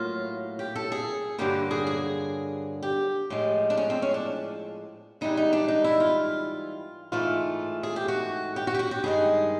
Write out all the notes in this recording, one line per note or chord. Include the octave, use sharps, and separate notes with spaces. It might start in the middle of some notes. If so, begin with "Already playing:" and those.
Already playing: A2 F#3 A#3 F4
G4
A4
G#4
G2 D3 F#3 A#3 G4
G#4
G#4
G4
A2 F3 G#3
D4
C#4
C4
C#4
D4
G#2 E3 G3 D#4
D#4
D4
D#4
E4
F4
G#2 E3 A3 F4
G#4
G4
F#4
G4
F#4
G4
F#4
G4
G2 D#3 G#3 G#4